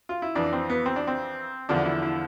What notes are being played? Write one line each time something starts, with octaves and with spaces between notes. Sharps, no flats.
F4
E4
F2 E3 D4
C4
B3
C4
D4
C4
E2 D3 F3 D4
E4
E4